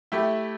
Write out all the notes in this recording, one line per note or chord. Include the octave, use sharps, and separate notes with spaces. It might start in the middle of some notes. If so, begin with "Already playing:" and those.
A3 E4 G4